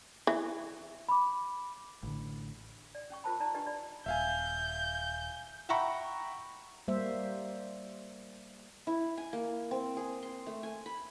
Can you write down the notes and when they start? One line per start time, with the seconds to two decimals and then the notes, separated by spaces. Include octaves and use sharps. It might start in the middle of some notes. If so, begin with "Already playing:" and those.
0.27 E3
1.09 B5 D6
2.03 A1 D3
2.95 D5
3.10 C#4 G5 C#6
3.24 F4 A#4 C5 A5 B5
3.40 D#4 D5 A5 A#5
3.54 D4 G4 B4 D5 D#5
3.67 D5 B5
4.06 D#1 E5 F5 G#5 G6
5.69 E5 F#5 G5 A#5 B5 C#6
6.88 G3 A#3 C5 E5
8.87 E4
9.18 G#5
9.33 A#3
9.71 C4
9.97 G#4
10.23 C6
10.47 A3
10.63 G#5
10.86 B5